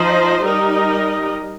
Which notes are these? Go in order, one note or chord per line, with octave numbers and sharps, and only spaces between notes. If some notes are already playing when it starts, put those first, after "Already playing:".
Already playing: F3 D#4 C5 D#5
G3 D#4 A#4 D#5